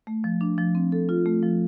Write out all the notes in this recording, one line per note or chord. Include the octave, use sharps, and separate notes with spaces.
A3
F3
D4
F3
C4
A4
F4
A3
F3